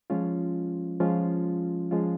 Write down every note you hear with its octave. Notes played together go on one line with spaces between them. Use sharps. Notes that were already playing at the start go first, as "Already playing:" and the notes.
F3 G#3 C#4 F4
F3 G#3 C#4 F4
F3 G#3 C#4 F4